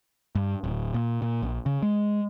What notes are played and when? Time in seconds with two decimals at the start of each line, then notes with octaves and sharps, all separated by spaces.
0.35 G2
0.64 D1
0.94 A#2
1.22 A#2
1.43 A#1
1.66 C#3
1.82 G#3